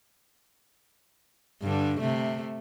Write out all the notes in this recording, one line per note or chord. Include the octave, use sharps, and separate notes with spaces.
G2 D3
C3 A3